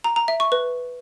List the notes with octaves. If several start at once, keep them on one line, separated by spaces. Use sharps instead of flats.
A#5
A#5
E5
C#6
B4